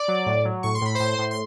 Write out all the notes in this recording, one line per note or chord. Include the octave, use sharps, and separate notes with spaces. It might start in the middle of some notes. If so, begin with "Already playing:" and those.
Already playing: D5 D6
F#3
A2
F#3
A2 C#6
C6
A2 B5
A2 C5 C6
A2
C6